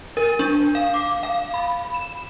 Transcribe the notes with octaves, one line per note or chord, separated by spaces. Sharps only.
A#4
D4
F5
D6
F5
B5
E7